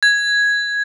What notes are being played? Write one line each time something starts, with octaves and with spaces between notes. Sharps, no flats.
G#6